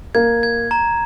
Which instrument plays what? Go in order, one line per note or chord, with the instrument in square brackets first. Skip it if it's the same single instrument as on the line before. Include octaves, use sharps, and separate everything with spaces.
[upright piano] A#3 [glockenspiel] G#6
[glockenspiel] G#6
A#5